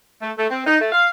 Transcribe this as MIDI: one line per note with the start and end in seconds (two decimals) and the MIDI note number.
0.21 0.31 57
0.37 0.46 57
0.50 0.64 60
0.65 0.76 63
0.80 0.88 57
0.92 1.08 77